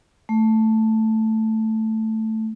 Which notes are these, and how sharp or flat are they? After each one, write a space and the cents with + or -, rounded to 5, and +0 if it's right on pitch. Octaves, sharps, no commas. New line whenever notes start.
A3 +5